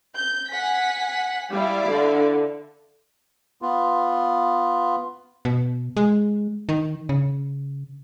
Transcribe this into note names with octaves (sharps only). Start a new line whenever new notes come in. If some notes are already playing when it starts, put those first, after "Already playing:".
G6
F#5 G#5 B6
G3 E4 D5 F5
D3
B3 F4
B2
G#3
D#3
C#3